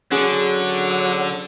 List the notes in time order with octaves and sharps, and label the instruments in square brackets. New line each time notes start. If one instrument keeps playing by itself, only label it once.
[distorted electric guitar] D3 [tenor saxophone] F#3 [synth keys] C#4 G#4